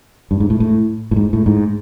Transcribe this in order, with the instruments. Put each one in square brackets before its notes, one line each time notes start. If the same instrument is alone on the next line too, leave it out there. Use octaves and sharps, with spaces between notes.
[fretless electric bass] G2
G#2
A2
A2
A2
G#2
A2
G#2